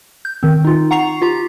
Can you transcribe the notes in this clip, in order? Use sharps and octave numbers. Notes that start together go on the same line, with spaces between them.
G6
D#3 C4
D#4 F4
F#5 A#5 C#6 C7 F7
F4 G4 A#5